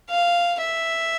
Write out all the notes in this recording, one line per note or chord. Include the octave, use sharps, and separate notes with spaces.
F5
E5